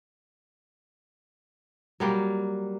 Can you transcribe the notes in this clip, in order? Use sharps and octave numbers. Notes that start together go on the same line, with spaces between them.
F#3 G3 A#3